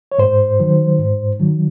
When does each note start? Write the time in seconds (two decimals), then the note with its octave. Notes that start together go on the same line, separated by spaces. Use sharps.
0.12 C#5
0.18 G#2 C5
0.60 D#3 F#3
0.98 G#2
1.40 D#3 F#3